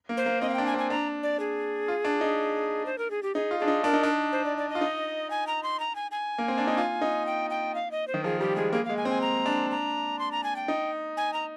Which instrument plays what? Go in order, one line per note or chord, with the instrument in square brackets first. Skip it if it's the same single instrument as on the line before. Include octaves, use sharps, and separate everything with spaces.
[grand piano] A#3
[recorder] C5
[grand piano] A#3
[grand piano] C4 [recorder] D#5
[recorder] F5
[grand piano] D4 [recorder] G5
[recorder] G#5
[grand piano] C4
[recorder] G#5
[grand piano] D4 [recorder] A#5
[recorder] D5
G#4
[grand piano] F4
D4
D#4
[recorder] C5
A#4
G#4
G4
[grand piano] D#4 [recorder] G#4
[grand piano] F4
[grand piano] D4 [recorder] G#4
[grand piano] D#4
[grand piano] D4 [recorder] A#4
[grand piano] D#4
D4
[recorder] C5
D5
D5
D#5
[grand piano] F4
D#4
[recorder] G#5
A#5
C6
A#5
G#5
G#5
[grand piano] A#3
C4
D4
D#4
F4
D#4
[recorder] G5
G5
F5
D#5
C5
[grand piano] D#3
[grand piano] F3 [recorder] G#4
[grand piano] G3 [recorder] G4
[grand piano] G#3 [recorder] G#4
[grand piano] A#3 [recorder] G#4
[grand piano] G#3 [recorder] F5
[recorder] G#5
[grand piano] C4
[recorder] G#5
A#5
[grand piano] D4
[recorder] A#5
C6
A#5
G#5
G5
[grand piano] D#4
[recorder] G#5
A#5